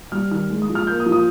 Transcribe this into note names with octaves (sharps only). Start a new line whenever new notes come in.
G3 F6
D#3 F6
G#3
D#6
F3
F6
A#3 G6
D#6
F3
D#6